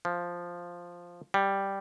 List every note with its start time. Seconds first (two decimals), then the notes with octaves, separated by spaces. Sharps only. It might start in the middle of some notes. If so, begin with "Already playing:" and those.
0.05 F3
1.34 G3